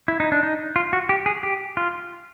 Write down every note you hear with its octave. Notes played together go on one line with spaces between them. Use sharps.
E4
D#4
D4
D#4
F4
F#4
G4
G#4
G4
F4